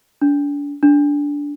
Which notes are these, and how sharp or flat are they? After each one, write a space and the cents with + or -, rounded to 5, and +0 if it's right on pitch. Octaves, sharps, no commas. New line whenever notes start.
D4 -35
D4 -15